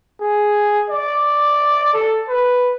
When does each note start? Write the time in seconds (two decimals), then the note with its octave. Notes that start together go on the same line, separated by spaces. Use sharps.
0.21 G#4
0.90 D5
1.94 A4
2.29 B4